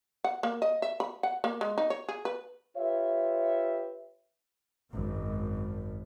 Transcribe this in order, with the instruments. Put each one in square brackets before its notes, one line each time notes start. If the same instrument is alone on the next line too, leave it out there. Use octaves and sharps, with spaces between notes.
[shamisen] F#5
A#3
D#5
E5
B5
F#5
A#3
G#3
D#4
C#5
G#4
B4
[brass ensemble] F4 G4 B4 C#5 E5
[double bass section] G#1 F#2